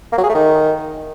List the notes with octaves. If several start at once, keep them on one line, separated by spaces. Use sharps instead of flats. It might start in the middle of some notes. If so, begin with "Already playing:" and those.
A#3
F#3
G#4
A3
D#3